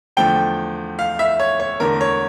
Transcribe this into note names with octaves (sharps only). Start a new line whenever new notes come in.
E2 D3 F3 A3 G5
F5
E5
C#5
C#5
E2 D3 A3 A#4
C#5